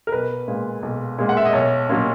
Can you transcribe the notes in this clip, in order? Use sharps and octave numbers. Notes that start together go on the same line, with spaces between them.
A#4
B1 B4
A#2 G#3
B1
A#2 G#3
F#5
E5
D#5
B1 C#5
A#2 F#3